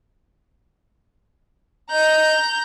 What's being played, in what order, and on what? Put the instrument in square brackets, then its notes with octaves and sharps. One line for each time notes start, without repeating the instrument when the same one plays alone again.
[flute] D#5 [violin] A#5 G6